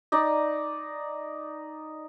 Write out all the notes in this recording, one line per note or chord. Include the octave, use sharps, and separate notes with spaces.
D#4 D5 D#5